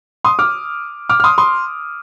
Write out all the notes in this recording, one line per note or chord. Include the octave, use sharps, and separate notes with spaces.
C6 D#6
D6 F6
D6 F6
F6
C6 D#6
C6 D#6